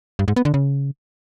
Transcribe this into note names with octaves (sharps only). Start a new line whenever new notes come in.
G2
G#2
B3
D3
C#3